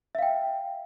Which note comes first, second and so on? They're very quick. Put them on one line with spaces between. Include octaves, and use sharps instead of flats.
E5 F5 G5